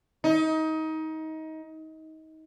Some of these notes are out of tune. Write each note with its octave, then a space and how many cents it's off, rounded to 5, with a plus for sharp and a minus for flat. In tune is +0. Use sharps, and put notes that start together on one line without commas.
D#4 +25